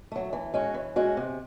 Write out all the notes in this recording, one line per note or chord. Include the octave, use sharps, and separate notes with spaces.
F#3 A3
E3
G#3 C#4 F#4
E3
G#3 C#4 F#4
C3